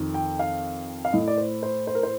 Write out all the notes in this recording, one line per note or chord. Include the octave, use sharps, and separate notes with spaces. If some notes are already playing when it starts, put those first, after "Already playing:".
Already playing: F2 D#3
G5
F5
F5
A2 D#5
D5
C5
C5
C5
A#4
C5